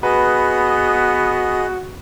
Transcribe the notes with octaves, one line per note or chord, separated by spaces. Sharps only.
B3 F#4 G#4 B4 D#5